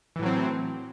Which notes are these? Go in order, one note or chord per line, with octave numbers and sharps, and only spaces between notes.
A2 E3 F#3 C4